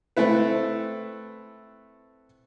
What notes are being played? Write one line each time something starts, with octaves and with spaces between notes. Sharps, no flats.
A3 C4 E4 B4